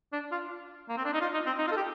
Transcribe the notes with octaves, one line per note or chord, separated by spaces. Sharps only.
D4
F4
A#3
C4
D4
D#4
F4
D#4
C4
D#4
F4
A4
G4